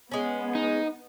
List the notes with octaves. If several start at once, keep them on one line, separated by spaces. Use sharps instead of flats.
G#3 B3 C#4
D#4